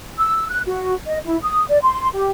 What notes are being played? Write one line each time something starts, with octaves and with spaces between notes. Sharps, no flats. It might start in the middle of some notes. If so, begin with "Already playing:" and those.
E6
F#6
F#4
D#5
E4
D#6
D5
C6
G4